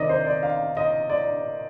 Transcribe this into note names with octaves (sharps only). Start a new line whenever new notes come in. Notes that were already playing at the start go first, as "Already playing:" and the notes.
Already playing: C3 D#3 D5 D#5
C5
D5
F5
D#5
D5